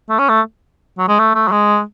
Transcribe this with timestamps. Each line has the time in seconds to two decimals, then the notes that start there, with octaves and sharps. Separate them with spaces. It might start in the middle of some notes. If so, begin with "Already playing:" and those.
0.10 A3
0.19 C#4
0.29 A3
0.98 F#3
1.08 G#3
1.19 A3
1.35 A3
1.48 F#3
1.52 G#3